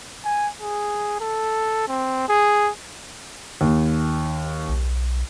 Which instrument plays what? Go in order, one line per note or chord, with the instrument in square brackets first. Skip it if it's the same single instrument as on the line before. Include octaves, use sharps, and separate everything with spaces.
[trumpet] G#5
G#4
A4
C4
G#4
[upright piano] D#2
[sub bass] B1